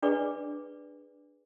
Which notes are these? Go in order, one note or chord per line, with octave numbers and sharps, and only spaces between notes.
D4 G#4 B4 D5 D6